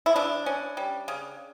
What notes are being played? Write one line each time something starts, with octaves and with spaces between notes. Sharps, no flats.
E4
C#3 D4
C#4
G3
C#3